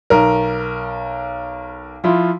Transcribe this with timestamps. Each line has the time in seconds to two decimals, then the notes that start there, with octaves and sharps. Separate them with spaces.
0.10 B1 A#4
2.04 F3 E4 F4